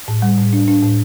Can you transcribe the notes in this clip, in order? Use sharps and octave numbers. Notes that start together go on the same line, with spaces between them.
A2
G3
A2
D4
D4
A2